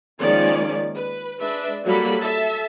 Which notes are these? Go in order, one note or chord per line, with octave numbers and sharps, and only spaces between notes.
D#3 F3 G#3 A#3 C#4 D5
B4
G#3 D4 B4 E5
F#3 G3 A#3 F#4 A4 B5
A4 E5 A5